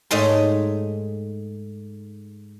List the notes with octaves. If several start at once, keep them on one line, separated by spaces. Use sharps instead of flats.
G#2 A3 D#4 C#5 G#5 C6